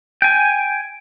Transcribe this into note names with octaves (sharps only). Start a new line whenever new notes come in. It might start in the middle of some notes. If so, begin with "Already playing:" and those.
G5 G#5